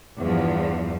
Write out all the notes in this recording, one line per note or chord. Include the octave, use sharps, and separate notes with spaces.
E2 G2 F3